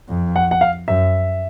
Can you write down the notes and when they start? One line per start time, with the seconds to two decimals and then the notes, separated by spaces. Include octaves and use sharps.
0.09 F2
0.36 F#5
0.51 F#5
0.61 F5
0.88 F#2 E5